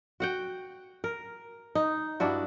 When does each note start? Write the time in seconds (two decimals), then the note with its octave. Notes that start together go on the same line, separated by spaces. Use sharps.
0.20 F#4 F#5 G5
1.04 A#4
1.75 D#4
2.20 G2 D4 E4 F#4